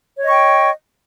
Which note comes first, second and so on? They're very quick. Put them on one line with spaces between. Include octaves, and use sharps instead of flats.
C#5 D#5 C#6 G5